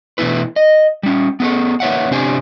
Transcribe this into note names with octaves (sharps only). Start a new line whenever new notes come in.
B2 E3 A3 B3 E4 B4
D#5
G3 C#4
B3 G#4 A4
A#3 B4 C#5 E5 F#5
C3 C4 D4 G4 C5 G#5